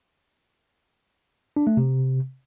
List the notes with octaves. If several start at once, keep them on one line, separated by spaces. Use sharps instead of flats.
D4
A3
C3